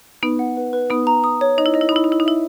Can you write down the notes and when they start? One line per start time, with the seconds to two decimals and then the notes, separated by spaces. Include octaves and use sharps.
0.23 B3 D#4 B4
0.39 F#5
0.57 B4
0.73 B4
0.90 B3 D#4 D#6
1.07 A#5
1.24 D#6
1.41 C#5
1.58 D#4 D#5
1.66 E4
1.74 D#4 D#5
1.81 E4
1.89 D#4
1.92 E4 B5
2.04 D#4
2.09 E4 D#5
2.20 D#4
2.25 E4 E5